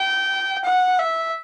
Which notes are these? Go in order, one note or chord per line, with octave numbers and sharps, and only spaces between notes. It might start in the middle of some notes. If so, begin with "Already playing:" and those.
Already playing: G5
F#5
E5